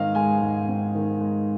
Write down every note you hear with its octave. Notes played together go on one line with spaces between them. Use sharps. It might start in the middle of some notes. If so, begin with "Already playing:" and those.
Already playing: G#2 D#3 C4 D#5 F5
G#3 G#5
G#2
C4
D#3
G#3